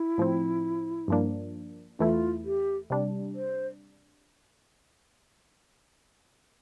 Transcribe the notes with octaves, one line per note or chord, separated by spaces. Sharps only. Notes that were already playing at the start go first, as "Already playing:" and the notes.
Already playing: E4
A2 F3 C4
G2 F3 A#3 D4
E2 E3 A3 E4 F4
G4
C3 G3 D4
C5